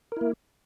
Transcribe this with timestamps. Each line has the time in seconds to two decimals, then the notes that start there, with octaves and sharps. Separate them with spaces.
0.12 A#4
0.17 E4
0.21 A#3